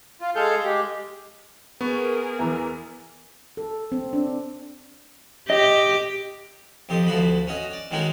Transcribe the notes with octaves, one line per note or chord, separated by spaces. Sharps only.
F4
G#3 G#4 A4 F5 G6
G#3 G4
B3 G#4 A#4 C#6
E2 E3 A#5
A4
C4
D4
G4 D#5
F2 G4 D#5 C6 D#6
D2 F3 F#4 B5
C#4 F#4 D#5
D5
D#3 G#3 C#4 D#4 F#4 A#4